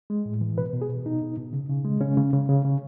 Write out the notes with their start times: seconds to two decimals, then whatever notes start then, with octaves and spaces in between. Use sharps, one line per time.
0.10 G#3
0.26 A2
0.41 E3
0.58 B2 B4
0.73 B2
0.82 G#4
0.89 B2
1.06 B2 D#4
1.21 B2
1.37 B2
1.53 C#3
1.69 C#3
1.85 G#3
2.01 C#3 C#4
2.17 C#3
2.33 C#3
2.49 C#3
2.65 C#3